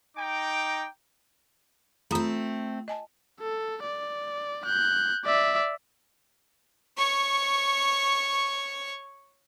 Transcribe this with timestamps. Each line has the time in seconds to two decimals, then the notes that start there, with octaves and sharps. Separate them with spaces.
0.18 D#4 G5 A#5 D6
2.11 A3 C4 F4 A#5 B5
2.88 D#5 G#5 A5
3.40 A4
3.83 D5
4.66 F#6 G6
5.25 D5 E5
6.97 C#5 C#6